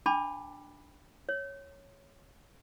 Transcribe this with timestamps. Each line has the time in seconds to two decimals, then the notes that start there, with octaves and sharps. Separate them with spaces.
0.06 D4 G5 A5 B5 D6
1.29 C#5